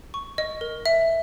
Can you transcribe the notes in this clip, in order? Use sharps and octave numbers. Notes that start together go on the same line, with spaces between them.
C#6
D#5
A#4
E5